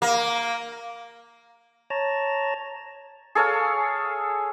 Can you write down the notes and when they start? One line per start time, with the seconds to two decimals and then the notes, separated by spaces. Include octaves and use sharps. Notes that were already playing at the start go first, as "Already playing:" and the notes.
0.02 A#3
1.90 C#5 A5 A#5
3.35 G#4 A4 C#5 F5